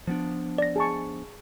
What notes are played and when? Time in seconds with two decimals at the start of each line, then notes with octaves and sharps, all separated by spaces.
0.07 F3 B3 D4
0.58 D5 A#6
0.76 G#4 A5 C#6